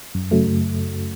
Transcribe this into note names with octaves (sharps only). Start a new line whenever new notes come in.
F#2
C#3 F#3 A3
F#2